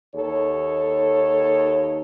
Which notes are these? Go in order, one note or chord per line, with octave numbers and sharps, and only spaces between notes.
D#2 D#4 A4 C#5